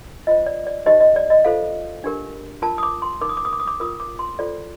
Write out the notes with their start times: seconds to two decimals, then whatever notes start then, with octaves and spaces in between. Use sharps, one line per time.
0.27 F4 C5 D#5
0.46 D5
0.67 D5
0.86 D#4 G4 C5 D#5
1.01 D#5
1.16 D5
1.30 D#5
1.45 F4 A4 C5 F5
2.04 D4 G4 A#4
2.62 F4 A#4 A5
2.78 D#6
2.83 D6
3.02 C6
3.21 D#4 A#4 D6
3.29 D#6
3.37 D6
3.45 D#6
3.53 D6
3.60 D#6
3.67 D6
3.80 F4 A#4 D#6
4.00 D6
4.19 C6
4.39 F4 A4 C5 D5